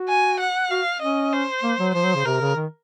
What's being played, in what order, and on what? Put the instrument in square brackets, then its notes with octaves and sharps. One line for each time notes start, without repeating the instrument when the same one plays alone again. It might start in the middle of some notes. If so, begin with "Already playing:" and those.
Already playing: [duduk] F#4
[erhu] G#5
F#5
[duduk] F#4 [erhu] F5
[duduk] C#4 [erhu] D#5
[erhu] C5
[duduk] A#3
F#3
[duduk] F3 [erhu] C5
[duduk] F#3
C#3
[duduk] C3 [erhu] A#4
[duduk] C#3
D#3